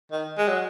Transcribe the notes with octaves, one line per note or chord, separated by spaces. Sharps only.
D#3
G#3
F#3